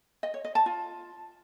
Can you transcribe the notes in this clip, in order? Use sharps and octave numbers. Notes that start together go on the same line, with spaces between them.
D#5
C#5
D#5
A5
F4